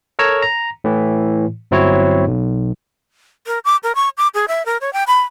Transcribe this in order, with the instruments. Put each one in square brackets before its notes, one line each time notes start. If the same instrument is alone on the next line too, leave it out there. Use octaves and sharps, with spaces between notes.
[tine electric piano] A4 A#4 C#5 A#5 E6 G#6
A#5
A2 E3
G1 F#3 C4 E4 C#5
B1
[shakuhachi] A#4
D6
A#4
C#6
D6
G#4
E5
A#4
C#5
G5
B5